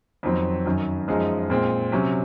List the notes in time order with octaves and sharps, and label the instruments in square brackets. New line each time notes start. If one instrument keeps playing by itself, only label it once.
[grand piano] F2 D#3 F#3 C4
F#2 D#3 F#3
F#2 F3 G#3 D#4
A#2 G#3 C4
C3 F#3 C#4